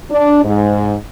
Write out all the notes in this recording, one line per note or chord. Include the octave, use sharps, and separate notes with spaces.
D4
G#2